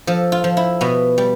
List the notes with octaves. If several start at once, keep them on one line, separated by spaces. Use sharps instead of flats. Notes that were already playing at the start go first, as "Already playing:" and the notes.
F3 A4
F4
F3
E4
B2 B3
G3